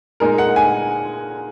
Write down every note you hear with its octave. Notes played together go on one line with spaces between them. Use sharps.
A#2 G#3 D#4 A#4
F#5
G#5